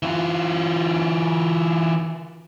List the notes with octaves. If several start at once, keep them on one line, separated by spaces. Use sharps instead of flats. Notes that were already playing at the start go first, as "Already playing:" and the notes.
E3 F4